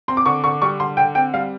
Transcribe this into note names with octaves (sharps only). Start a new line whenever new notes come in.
C4 C6
D6
D3 C#6
D3 C#6
G3 C#6
D3 C6
D3 G5
C4 G5
G3 F5